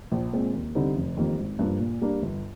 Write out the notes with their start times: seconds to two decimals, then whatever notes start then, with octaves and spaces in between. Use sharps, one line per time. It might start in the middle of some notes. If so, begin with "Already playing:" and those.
0.12 A#1
0.33 A#2 G#3 C4
0.54 D#2
0.75 D3 G3 C4 D#4
0.96 F1
1.17 F2 D#3 G3 A#3
1.38 G#1
1.59 G2 F3 A#3 D4
1.80 A#2
2.01 G3 A#3 D4
2.22 G1